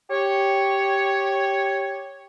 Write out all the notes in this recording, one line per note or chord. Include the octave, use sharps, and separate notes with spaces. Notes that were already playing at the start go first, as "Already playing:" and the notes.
G4 C#5